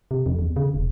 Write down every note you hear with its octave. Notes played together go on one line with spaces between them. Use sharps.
C3
F2
E2
C#3
E1